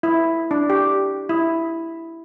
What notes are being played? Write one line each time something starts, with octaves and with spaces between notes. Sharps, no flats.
E4
D4
G4
E4